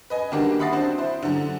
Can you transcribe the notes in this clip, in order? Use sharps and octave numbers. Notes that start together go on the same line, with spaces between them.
B4 D#5 G#5
D#3 G3 A#3 D4 F#4
E5 F#5 B5 D#6 A6 C7
C4 D4 E4 F#4 C5
E4 C5
F#2 D3